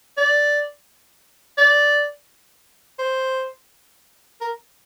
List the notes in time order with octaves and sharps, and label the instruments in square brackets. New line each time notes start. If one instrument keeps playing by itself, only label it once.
[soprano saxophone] D5
D5
C5
A#4